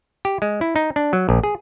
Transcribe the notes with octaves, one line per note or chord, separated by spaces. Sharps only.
G4
G#3
E4
D#4
D4
F#3
A#1
G#4